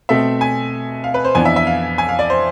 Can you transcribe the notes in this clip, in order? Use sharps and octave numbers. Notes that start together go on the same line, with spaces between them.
B2 A3 C4 E5
G#5
F5
B4
C5
F2 E3 B3 D4 G#5
E5
E5
F5
G#5
F5
D5
C5